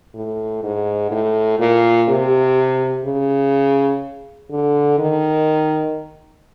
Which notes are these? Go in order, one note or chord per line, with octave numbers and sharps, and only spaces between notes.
A2
G#2
A2
A#2
C3
C#3
D3
D#3